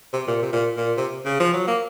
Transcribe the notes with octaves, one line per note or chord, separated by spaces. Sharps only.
C3
A#2
C3
A#2
A#2
C3
C#3
F3
F#3
A#3